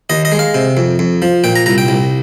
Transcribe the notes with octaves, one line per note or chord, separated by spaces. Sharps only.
D#2 D#5
D#5
G#3
F5
C3
F2
F2
F3
A#2 G5
A#5
C2 A#5
G5
C2